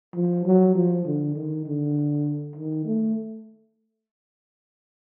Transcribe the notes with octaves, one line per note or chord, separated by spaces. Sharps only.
F3
F#3
F3
D3
D#3
D3
D#3
A3